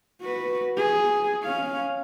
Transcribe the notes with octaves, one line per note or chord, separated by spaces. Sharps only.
F#4 B4
G#4
C#4 F5